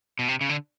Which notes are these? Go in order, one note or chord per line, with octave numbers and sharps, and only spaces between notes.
B2
C3
C#3
D3